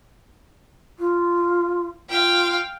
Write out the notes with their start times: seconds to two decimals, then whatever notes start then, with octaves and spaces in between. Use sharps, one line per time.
0.99 F4
2.10 F4 F5 G5